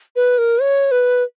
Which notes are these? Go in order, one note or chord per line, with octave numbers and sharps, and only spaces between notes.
B4
A#4
C#5
B4